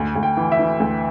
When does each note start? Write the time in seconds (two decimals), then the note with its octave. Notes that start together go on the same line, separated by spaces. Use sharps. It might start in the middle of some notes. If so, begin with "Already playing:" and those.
Already playing: D2
0.16 D2
0.23 G5
0.37 E3
0.52 E5
0.59 E3
0.80 D2